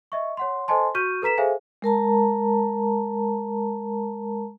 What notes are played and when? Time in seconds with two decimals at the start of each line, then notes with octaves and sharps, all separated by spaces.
0.12 D#5 E5 C#6
0.37 C#5 F#5 C6
0.68 A4 C5 D#5 G#5 A5 C6
0.95 F#4 C#6 F6 G6 D#7
1.22 A4 B4 A#5 B6 E7
1.38 G#4 A4 C5 E5 F5 G#5
1.82 G#3 A#4 A5 A#5